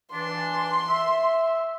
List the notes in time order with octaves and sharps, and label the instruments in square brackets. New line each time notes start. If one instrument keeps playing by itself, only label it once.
[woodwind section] E3 D4 [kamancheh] C6
[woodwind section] E5